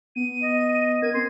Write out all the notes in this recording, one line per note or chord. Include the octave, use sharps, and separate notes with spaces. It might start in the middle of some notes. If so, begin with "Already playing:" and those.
B3 D#7
D#5
A#4 G#6
C4 C6